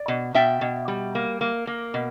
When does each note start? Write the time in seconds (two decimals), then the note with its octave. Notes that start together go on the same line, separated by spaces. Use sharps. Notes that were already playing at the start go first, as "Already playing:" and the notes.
Already playing: D5
0.08 B2
0.34 B2 E5 G5
0.61 B2
0.88 G3
1.15 A#3
1.41 A#3
1.67 A#3
1.94 B2